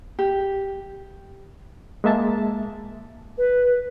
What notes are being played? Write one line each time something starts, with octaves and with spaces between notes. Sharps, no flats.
G4
G#3 A#3 E5 A5
B4